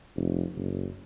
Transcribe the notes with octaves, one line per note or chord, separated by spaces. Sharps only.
F1
F#1